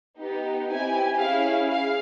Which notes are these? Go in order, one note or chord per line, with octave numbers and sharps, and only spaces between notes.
B3 D#4 G4
C4 E4 G4 G#5
C#4 E4 G#4 F5
G#4 F5